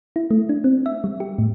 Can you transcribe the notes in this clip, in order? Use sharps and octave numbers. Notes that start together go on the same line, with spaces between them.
E4
A3
D4
C4
E5
G3
G4
A2